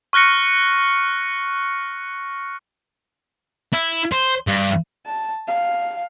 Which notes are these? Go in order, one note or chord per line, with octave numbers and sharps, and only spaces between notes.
C#6 F6 F#6 A#6 C#7
E4
C5
G2
A5
F5